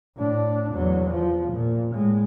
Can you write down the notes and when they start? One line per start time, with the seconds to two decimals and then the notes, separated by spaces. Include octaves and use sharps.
0.17 A2 D4
0.73 E2 F#3
1.11 F3
1.52 A#2
1.93 A2 G#3